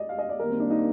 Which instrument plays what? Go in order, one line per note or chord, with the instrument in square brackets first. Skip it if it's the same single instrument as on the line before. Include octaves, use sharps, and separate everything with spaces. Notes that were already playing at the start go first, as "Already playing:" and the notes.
Already playing: [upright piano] D5 D#5
F5
D#5
D5
[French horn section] D#3 G3 A#3 [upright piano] A#4
[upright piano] C4
D4
D#4